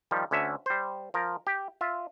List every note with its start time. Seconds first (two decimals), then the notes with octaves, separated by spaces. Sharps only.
0.11 D#3 F3 G3
0.31 D2 D3 C#4 E5
0.66 G3 C5
1.14 F3 A#4
1.47 G4
1.81 F4 E5